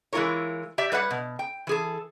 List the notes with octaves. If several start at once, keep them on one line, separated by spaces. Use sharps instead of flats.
E3 G#3 E4 F4 A#4 C#5
G4 D5 E5
G3 B4 C#5 F#5
B2
G5
E3 G#4 A4